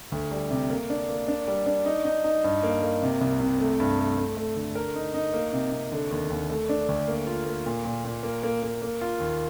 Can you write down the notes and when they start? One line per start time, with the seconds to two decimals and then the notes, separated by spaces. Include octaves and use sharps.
0.12 D2
0.32 G3
0.51 C3
0.70 A#3
0.90 D4
1.09 A#3
1.28 D4
1.48 G3
1.66 D4
1.86 D#4
2.05 D#4
2.24 D#4
2.44 G2
2.63 A#3
2.82 A#3
3.03 C3
3.21 C2
3.41 C3
3.60 A3
3.80 G2
3.99 A3
4.18 A3
4.37 A3
4.56 D3
4.75 A#4
4.96 D#4
5.14 D#4
5.34 A#3
5.53 C3
5.72 C3
5.92 D3
6.11 D#2
6.30 D#2
6.50 A3
6.69 D4
6.89 D2
7.08 A#3
7.27 F4
7.46 A#3
7.66 A#2
7.85 A#2
8.05 A#2
8.23 A#3
8.43 A#3
8.63 A#3
8.82 A#3
9.01 F4
9.20 D#2